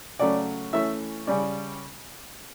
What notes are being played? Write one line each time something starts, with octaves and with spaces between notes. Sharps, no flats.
C#3 F#3 A3 C#4 D5
E3 A3 C#4 E5
C#3 G3 C#4 D5